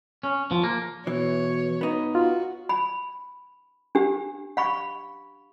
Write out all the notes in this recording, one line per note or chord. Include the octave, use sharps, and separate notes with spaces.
C#4
F3
A#3
B2 E3 C#5
B3 D#4
F4 F#4
B5
D4 G4
F5 B5 C#6